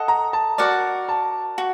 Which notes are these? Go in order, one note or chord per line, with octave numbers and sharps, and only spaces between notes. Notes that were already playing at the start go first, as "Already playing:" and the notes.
Already playing: A4 D#5 F#5
A#5
A5
F#4 A#4 D5 F#5
A5
F#4